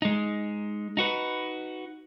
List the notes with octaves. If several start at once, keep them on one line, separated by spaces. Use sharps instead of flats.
G#3 D#4
D#4 F#4 B4